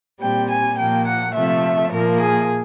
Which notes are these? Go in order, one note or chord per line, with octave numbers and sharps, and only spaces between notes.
A#2 G3 C4 G5
G#5
A#2 F3 A#3 G5
F#5
C3 F3 A3 E5
A#2 F3 A#3 A#4
G#4